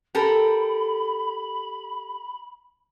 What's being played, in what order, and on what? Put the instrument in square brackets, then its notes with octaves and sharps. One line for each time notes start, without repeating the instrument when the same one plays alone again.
[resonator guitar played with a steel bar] G4 A4 A#4 [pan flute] B5